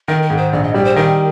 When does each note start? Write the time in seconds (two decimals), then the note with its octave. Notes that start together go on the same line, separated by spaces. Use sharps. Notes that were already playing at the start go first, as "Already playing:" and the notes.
0.08 D#3 A#4
0.23 A#4
0.30 G#2
0.38 C5
0.53 A#1 D5
0.63 D#5
0.74 G3 D5
0.85 C5
0.96 D#3 A#4